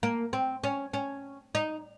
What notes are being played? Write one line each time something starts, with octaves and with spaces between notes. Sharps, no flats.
A#3
C4
C#4
C#4
D#4